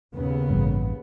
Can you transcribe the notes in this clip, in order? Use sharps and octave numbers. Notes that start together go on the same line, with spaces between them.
D#2 C#3 B3
A1 G2